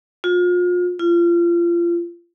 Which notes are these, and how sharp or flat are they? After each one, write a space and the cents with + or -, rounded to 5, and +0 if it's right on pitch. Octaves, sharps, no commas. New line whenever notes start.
F4 +35
F4 -30